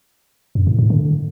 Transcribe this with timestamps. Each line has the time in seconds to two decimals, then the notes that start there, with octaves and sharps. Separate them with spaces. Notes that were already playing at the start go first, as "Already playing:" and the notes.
0.55 F#2
0.67 A2
0.79 A2
0.90 D3